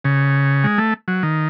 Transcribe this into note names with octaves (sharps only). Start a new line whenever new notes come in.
C#3
G#3
A3
F#3
D#3